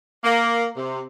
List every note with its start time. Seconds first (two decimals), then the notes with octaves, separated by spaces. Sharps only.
0.24 A#3
0.77 C3